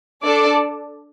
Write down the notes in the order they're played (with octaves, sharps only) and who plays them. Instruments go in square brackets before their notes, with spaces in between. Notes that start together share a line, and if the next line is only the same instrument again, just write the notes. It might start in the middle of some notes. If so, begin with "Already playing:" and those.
[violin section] D4 A4 D5 A5